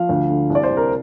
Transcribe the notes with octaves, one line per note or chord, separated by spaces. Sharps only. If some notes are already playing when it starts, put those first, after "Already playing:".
Already playing: F3 F5
D2
D3
C2
D5
C5
C3
A#4